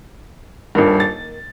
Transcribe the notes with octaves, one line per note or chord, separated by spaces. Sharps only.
D#1 G2 D#3 A#3
A6